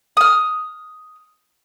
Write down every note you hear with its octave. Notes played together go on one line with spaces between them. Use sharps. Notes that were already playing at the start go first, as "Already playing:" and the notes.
D#6 F6